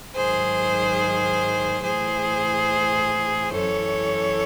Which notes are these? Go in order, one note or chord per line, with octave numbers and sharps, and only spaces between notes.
G#2 D#3 F#3 G#4 C5
A2 E3 G#4 C5
F#2 E3 A4 C#5